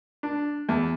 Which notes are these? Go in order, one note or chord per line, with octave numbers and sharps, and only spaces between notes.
D4
E2